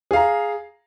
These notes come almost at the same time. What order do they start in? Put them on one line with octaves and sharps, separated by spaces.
G#4 F5 A#5